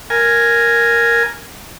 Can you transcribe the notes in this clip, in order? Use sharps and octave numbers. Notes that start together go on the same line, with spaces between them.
A#4 G#5